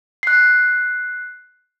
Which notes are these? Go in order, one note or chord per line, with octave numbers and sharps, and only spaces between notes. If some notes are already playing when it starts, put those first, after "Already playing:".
F#6 C7